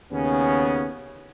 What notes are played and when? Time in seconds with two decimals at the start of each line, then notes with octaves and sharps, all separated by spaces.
0.12 D#2 C#3 B3 C#4